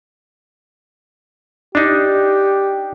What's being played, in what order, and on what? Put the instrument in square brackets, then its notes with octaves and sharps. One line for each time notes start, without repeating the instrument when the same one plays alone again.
[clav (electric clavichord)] D4 D#4 [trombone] G4